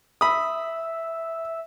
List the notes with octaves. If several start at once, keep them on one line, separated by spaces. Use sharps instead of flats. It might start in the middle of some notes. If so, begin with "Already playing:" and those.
E5 B5 D#6